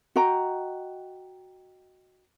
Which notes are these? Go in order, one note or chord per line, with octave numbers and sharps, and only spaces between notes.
F#4 D#5 G5 A#5